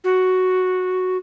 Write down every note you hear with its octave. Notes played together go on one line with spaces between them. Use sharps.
F#4